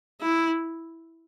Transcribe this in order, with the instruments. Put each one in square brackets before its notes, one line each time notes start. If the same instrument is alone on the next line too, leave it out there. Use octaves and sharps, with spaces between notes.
[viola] E4